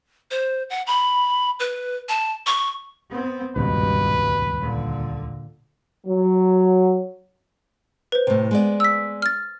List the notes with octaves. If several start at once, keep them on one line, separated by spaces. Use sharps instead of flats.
C5
F#5
B5
B4
A5
C#6
B3 C4
D#1 C#2 G2 B2 B4
A#2 D3
F#3
B4 C5
A2 C3
G#3 B3 D5
E6 B6
F6 A6